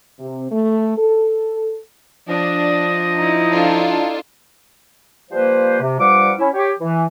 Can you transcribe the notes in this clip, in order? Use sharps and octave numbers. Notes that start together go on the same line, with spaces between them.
C3
A3
A4
F3 D4 D#5
D#4 E4
D4 F4 A4
F3 G3 A#3 B4 C5
C3
G2 F3 G3 F#5 D6
C#4 E4
G4 C#5
E3